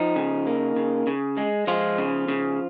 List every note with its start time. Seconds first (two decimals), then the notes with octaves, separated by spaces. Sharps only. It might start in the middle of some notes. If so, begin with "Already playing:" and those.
Already playing: F3 D#4
0.16 C#3
0.47 A#3
0.77 C#3
1.07 C#3
1.37 G#3
1.67 F3 G#3 F4
1.98 C#3
2.28 C#3